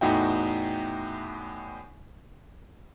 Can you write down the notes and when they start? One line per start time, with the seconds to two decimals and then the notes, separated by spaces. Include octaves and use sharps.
0.01 E2 A2 D#4 F#4 E5 G5